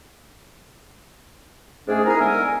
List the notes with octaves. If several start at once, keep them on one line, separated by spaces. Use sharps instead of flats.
G#2 A3 C#4 D4 G#4
C4 D#4 E4 G#4 A#4
D3 G#3 B3 A#4 E5 G#5